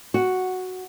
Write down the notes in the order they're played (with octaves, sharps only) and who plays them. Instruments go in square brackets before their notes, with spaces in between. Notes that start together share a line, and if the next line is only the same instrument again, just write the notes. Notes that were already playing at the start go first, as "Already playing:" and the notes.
[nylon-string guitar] F#4